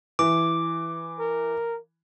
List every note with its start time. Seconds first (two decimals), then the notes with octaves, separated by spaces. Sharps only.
0.19 E3 D6
1.20 A#4